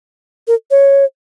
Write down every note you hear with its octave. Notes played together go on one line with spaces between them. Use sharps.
A#4
C#5